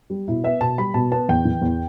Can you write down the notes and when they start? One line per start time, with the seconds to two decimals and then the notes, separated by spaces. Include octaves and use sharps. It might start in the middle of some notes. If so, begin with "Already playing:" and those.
0.10 G3
0.28 B2 E4
0.44 B3 E5
0.60 B2 A5
0.78 G3 B5
0.94 B2 A5
1.11 B3 A5
1.29 E2 G5
1.45 E3
1.62 E2